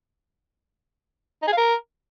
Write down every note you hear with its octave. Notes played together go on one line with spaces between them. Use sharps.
D#4
G#4
F5
A#4